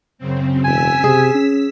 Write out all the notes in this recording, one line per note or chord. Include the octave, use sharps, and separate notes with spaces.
F#2 C#3 C4
E1 G#5 E6 B6
C3 G#4
C#4